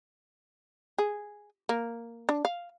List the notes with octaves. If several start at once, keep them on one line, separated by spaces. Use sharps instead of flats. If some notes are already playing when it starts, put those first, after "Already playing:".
G#4
A#3
D4
F5